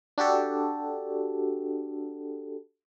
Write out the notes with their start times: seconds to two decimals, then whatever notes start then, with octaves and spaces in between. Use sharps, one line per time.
0.18 D4 F#4 G4 A4